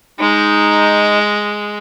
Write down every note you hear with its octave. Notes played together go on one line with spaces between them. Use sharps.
G#3 D#4